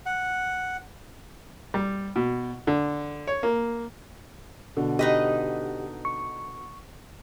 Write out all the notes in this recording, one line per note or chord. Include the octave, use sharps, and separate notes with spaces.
F#5
G3
B2
D3
C#5
A#3
B2 D3
D#4 G4 B4 D#5
C#6